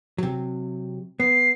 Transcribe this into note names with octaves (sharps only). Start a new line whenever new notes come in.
C3 F#3
B3 C7